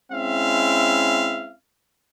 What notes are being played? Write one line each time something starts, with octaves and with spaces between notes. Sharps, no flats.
G#3 C4 C#4 E4 E5 F5